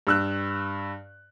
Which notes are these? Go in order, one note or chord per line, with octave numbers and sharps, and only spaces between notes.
G2 E6 F#6